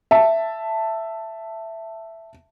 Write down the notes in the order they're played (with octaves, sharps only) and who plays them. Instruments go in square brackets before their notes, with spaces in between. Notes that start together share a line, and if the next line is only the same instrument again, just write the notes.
[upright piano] E5 A5